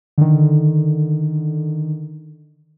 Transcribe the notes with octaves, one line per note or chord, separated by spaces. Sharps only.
D3 D#3